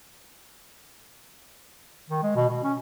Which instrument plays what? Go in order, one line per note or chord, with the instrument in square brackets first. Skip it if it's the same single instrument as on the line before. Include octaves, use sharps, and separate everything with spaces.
[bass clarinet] D#3
G#3
B2
B2
C#4